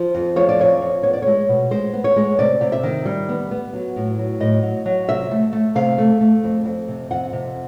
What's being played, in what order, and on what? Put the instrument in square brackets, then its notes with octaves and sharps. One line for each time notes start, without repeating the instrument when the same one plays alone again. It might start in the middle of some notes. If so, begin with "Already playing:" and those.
Already playing: [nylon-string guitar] F3 C5
F2
F3 C#5
D5
F2 C#5
F2
B3 C#5
D5
G#3 C#5
B2
G#3 C5
B3
C#5
G#3
C3 D5
C3
E5
D#3
G3
B3
B3
F#3
A2
F#3
A2 D#5
F#3
F#3
C3 E5
A3
A3
C3 F5
A3
A3
F2
F2
C3
F2 F#5
C3